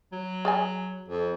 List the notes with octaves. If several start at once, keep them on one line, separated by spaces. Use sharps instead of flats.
F#3
G#4 D5 G#5
F2